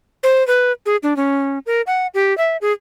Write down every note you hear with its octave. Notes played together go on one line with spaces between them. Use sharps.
C5
B4
G#4
D4
C#4
A#4
F#5
G4
E5
G#4